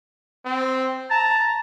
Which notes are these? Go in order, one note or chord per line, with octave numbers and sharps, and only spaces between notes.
C4
A5 A#5